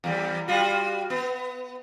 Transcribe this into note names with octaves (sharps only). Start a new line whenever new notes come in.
E2 G3
G3 F4 F#4
B3